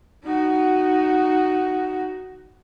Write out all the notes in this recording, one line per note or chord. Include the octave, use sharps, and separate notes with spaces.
D#4 F#4